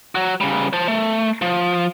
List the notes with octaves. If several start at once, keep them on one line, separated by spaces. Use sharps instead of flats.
F#3 F#4
C#3 G3
C5 A5
A3
F3